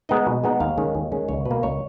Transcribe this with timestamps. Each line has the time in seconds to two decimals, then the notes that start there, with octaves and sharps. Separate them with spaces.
0.09 G#3 B3 D#4 D#5
0.26 B2
0.44 G#3 B3 D#4
0.60 D#2 F5
0.78 D#3 G#3 C#4
0.95 D#2
1.12 D#3 G#3 C#4
1.28 C#2 C#5
1.45 B2 B4
1.51 A#3
1.63 C#2 C#5